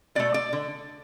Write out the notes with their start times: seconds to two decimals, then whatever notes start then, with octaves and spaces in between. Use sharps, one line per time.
0.15 B2 A3 D5
0.34 D5
0.53 D3